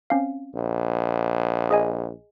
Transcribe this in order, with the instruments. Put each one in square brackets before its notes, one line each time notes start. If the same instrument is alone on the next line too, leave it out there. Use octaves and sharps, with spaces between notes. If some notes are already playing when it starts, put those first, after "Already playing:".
[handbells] C4 C#4 F5
[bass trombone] A#1
[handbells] G#4 D#5 G#5